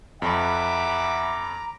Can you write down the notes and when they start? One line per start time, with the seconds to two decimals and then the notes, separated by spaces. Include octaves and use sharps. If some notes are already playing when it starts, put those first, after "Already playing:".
0.22 F2 E5 F#5 G#5 A#5 B5 D6